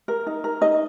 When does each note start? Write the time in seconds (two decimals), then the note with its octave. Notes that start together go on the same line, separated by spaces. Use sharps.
0.08 A#4
0.27 D#4
0.44 A#4
0.61 D#4 D#5